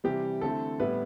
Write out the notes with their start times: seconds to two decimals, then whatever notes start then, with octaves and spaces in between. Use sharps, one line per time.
0.04 C3 E3 G3 G4
0.41 D3 A3 C4 E4 A4
0.80 A2 G3 B3 E4 B4